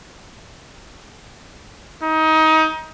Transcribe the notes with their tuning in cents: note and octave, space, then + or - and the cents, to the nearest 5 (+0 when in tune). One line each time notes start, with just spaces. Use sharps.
D#4 +25